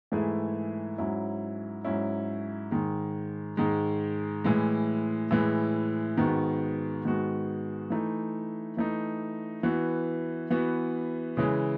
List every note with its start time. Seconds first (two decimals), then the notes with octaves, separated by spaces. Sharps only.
0.12 G#2 E3 A3 E4 G#4
0.98 G#2 F#3 C#4 E4
1.85 G#2 F#3 C#4 E4
2.71 G#2 D#3 G#3
3.57 G#2 D#3 G#3
4.44 A2 E3 G#3
5.31 A2 E3 G#3
6.17 G#2 D#3 G#3 B3 F#4
7.04 G#2 D#3 G#3 B3 F#4
7.90 E3 A3 D#4
8.77 E3 A3 D#4
9.63 E3 B3 F#4
10.50 E3 B3 F#4
11.37 C#3 E3 G#3